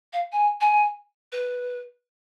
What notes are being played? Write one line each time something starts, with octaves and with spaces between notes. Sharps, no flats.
F5
G#5
G#5
B4